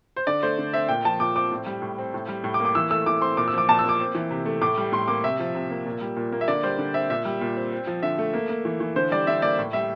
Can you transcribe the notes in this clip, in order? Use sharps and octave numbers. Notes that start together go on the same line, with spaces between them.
C5
D3 D5
A3 C5
D3
C4 E5
A#2 G5
F3 A5
A#2 D6
C4 D6
A2
G3
A2
C4
A2
G3
A2
D6
A#3
D6
E3 E6
A3 E6
E3 D6
C4 C6
A#2 D6
E6
F3 D6
A#2 A5
E6
A#3
D6
C4
E3
C3
A3
A2 D6
G3
A2 C6
A#3 D6
C3 E5
F3
C3
A#3
A#2
G3
A#2
A#3
E5
D3 D5
G3 C5
D3
C4 E5
A#2 E5
G3
A#2
C4
C4
F3
D3 E5
A3
A#3
A#3
E3
E3
D3 C5
G3 D5
D3 E5
A#3 D5
A2
G3 E5